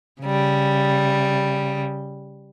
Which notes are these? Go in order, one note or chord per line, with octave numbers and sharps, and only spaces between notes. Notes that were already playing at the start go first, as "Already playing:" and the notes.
C#3 G3